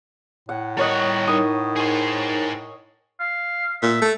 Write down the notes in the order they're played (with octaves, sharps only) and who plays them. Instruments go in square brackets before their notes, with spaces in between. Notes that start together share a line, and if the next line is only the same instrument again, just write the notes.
[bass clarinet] A2 [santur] F#5
[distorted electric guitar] G3 F#5 [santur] A#4 C#5 D#5
[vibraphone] D#4 A#4 [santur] D#6
[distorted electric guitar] G#4 C5
[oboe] F5
[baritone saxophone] A#2 [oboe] E5
[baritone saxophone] A3